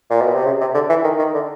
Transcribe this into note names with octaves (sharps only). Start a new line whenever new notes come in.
A#2
B2
C3
C#3
C3
D3
E3
D#3
D#3
D3